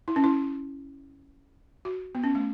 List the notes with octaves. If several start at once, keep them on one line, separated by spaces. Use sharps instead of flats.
E4
C#4
E4
F#4
B3
C#4
A3